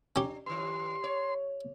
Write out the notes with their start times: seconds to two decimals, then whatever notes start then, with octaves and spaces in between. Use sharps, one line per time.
0.16 C#4 D4 G4
0.46 G2 D#3 C6
1.04 C#5